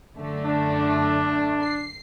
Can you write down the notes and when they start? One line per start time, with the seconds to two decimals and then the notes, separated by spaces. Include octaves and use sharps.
0.15 F#2 D3 A3
0.46 D4
1.62 C7